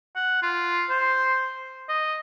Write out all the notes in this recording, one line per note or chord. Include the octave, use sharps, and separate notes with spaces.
F#5
F4
C5
D#5